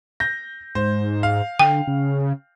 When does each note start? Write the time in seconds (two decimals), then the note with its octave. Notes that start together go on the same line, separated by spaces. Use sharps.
0.20 G6 A#6
0.75 G#2 C5
1.23 F5
1.59 D3 G5
1.87 C#3